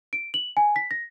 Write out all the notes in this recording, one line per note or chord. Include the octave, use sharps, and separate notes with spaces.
D7
F#7
G#5
B6
A#6